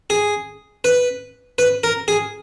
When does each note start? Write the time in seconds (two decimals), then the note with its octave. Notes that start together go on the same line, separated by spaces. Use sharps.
0.10 G#4
0.84 B4
1.58 B4
1.84 A#4
2.08 G#4